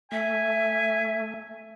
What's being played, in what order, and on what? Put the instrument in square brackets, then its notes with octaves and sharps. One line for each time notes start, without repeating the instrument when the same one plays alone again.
[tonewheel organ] A3 [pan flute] E5 [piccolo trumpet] G#5